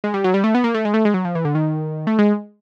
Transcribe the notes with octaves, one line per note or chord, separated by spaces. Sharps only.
G#3
G3
F#3
G3
A3
B3
A#3
A3
G#3
A3
G#3
F#3
F3
E3
D3
D#3
A3
G#3